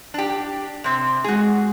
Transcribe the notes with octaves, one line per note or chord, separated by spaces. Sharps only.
D4 G4
C3 C4
G#3 F#4 G#4